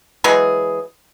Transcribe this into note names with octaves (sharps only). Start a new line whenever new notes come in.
E3 F#3 G#3 G#4